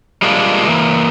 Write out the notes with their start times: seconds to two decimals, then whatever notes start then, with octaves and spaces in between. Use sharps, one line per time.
0.22 G3 G#3 A#3 D4 F4
0.68 E3 A#3